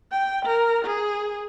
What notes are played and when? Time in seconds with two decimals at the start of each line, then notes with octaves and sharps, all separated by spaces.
0.12 G5
0.45 A#4
0.85 G#4